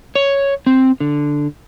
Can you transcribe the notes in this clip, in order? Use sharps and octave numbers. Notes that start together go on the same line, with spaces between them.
C#5
C4
D3